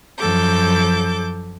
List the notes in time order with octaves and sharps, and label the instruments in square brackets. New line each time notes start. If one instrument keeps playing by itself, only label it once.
[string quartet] F#2 F3 A4 D6 G6